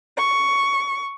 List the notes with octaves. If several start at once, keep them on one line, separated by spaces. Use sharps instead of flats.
C#6